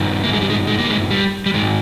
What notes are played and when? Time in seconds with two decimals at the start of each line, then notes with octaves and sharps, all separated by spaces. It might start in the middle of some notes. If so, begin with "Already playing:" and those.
Already playing: G2 D#3
0.24 A#3
0.33 G#3
0.41 G3
0.50 G#3
0.67 G#3
0.79 A#3
0.90 G#3
1.10 G3
1.46 G3
1.54 G#2 D#3 G#3